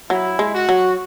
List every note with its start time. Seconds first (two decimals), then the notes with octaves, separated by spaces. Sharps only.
0.10 F#3 E4
0.39 G#3
0.54 F#4
0.69 F#3